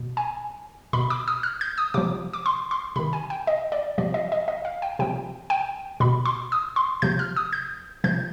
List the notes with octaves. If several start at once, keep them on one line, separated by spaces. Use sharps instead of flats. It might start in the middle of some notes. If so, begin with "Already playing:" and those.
Already playing: B2
G#5
B2 B5
D6
D#6
F6
G6
D#6
C3 F3 D6
D6
C6
C6
C3 D#3 B5
G#5
G5
D#5
D5
C3 F3 D5
D#5
D#5
D#5
F5
G5
C3 F3 G5
G5
B2 B5
C6
D#6
C6
C3 F3 G6
F6
D#6
G6
C3 F3 G6